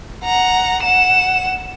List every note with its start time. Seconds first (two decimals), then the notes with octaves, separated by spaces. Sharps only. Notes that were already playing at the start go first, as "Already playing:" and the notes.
0.24 F#5 A#5
0.83 F#5 E7